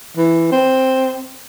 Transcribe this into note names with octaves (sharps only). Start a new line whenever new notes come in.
E3
C4